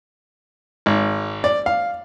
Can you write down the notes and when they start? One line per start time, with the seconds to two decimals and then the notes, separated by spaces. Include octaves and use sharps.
0.86 G#1
1.44 D5
1.66 F5